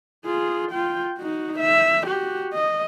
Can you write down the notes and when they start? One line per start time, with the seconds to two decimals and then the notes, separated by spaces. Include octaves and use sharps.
0.25 F4 G#4
0.72 F4 G5
1.18 D#4 F#4
1.59 E5
2.06 F#4 G4
2.53 D#5